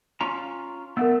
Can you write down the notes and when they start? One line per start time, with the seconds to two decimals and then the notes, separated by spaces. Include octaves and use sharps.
0.21 C#4 F4 A#5
0.97 A3 B3 A#4 F#5 E6